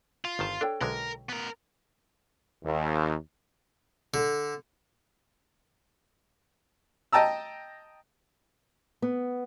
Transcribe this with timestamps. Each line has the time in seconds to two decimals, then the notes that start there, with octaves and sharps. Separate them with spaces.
0.25 F4 F5
0.39 G1 D#3 A5
0.61 D4 A4 C#5 G5
0.81 B1 D3 G#3 A#4
1.29 B3 A#4
2.64 D#2
4.14 D3
7.12 D#5 G5 A5 A#5 E6
9.02 B3